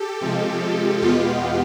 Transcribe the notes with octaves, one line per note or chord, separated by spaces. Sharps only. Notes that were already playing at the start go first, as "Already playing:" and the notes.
Already playing: G4 A4
C3 F3 G#3
E2 B2 G#3 B3 F4 G4